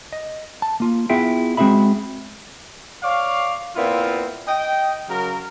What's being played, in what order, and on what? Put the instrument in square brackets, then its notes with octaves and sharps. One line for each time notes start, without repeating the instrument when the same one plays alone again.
[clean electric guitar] D#5
A5
A#3 F4
B3 E4 F4 G#4 E5 G5
G#3 C4 F#4 G#4 E5 B5
[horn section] C#5 D5 F5
A#2 B3 C4 E4 F4
D#5 G5
C#3 F#3 A#4